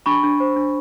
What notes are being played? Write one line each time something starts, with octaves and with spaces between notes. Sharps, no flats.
D4 B5 C#6
D4
C5
D4